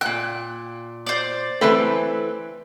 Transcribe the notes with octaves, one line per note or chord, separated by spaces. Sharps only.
A#2 G5 F#6
C5 D5
E3 A3 C4 B4